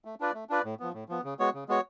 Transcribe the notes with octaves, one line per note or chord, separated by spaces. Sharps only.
A3
D4 F4 B4 D5
A3
D4 F4 B4 D5
A2
F3 B3
A2
F3 B3
C#3
G#3 B3 F#4 C#5
C#3
G#3 B3 F#4 C#5